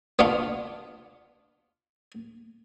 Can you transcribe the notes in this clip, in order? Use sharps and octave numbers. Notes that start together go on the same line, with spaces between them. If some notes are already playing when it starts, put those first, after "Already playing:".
B3 D4 F4